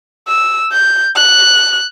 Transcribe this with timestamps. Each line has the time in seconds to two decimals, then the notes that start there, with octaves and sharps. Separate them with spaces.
0.28 E6
0.72 G6
1.16 F#6